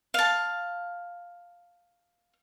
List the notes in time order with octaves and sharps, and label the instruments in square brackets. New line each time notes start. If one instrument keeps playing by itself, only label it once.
[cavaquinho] F5 A5